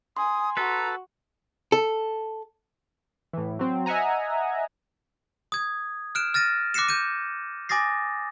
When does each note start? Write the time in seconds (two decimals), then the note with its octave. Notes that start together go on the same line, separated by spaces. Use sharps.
0.17 G#5 C6 D#6
0.57 F#4 A4 B4 A#5
1.72 A4
3.33 A2 E3
3.59 F#3 C4
3.86 D#5 E5 F#5 G#5 A#5
5.52 D#6 G#6
6.15 F6 F#6 D7 E7
6.34 F6 A6 A#6 D#7
6.74 D6 F#6 A#6 C7 C#7 E7
6.89 G6 D#7
7.69 G#5 D6 D#6 A6 A#6 C7